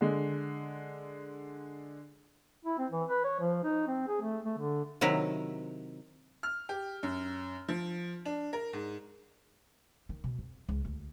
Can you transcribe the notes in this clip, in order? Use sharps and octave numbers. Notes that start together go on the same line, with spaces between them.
D3 G#3
E4
C4
E3
B4
C#5
F3
D#4
C4
G#4
A3
A3
D3
C3 D#3 F#3 E4
F6
G4
F#2
F3
D4
A#4
G#2
D#3
B2
F2
C#2
D2